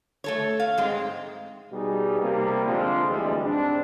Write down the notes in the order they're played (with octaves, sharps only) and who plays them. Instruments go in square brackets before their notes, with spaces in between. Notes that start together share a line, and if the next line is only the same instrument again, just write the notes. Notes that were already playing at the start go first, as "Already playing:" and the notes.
[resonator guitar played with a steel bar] A3 A4 C#5
F5
G#2 G#3 C4
[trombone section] B2 G3 D#4 G#4
C3 G3 A#3
D3 F3 G#3 C4 D4
D2 E3 G3 G#3
G#2 C4 D4